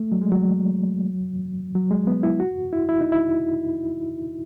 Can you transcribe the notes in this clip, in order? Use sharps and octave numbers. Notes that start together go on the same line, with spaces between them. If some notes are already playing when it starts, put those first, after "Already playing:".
Already playing: A3
F#3
G#3
F#3
F#3
G#3
B3
E4
F#4
E4
E4
D#4
E4